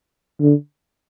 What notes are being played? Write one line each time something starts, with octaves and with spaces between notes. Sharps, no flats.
D3